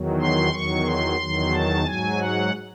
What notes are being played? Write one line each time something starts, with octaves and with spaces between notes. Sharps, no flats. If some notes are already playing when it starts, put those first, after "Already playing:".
Already playing: E2 D#3 F#3
C6
E2 D#3 F#3 C#6
C6
E2 D#3 F#3
A5
G#2 F#3 G#5
F#5